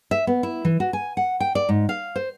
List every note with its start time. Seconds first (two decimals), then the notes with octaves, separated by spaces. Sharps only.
0.11 E5
0.27 B3
0.43 E4
0.65 E3
0.80 F#4
0.93 G#5
1.17 F#5
1.40 G5
1.55 D5
1.69 G#2
1.89 F5
2.16 C5